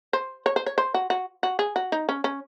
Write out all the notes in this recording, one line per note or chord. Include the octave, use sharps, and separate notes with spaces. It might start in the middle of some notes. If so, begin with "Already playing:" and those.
C5
C#5
C5
C#5
C5
F#4
F#4
F#4
G#4
F#4
D#4
C#4
C#4